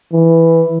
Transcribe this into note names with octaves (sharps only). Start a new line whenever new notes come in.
E3